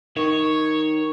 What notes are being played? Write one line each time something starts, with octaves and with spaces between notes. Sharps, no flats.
D#3 C#5